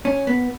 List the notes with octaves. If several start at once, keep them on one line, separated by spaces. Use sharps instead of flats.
C#4
B3